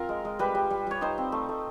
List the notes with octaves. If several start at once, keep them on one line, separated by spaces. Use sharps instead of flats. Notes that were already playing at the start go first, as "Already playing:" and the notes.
Already playing: C4 F4 A#4
G#3
G#3
G3 B4
G3
G3
G3 C#5
D#4 C5
C4
A3
A3